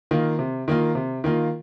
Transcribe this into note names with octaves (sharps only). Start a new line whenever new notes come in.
D#3 A#3 F4
C3
D#3 A#3 F4
C3
D#3 A#3 F4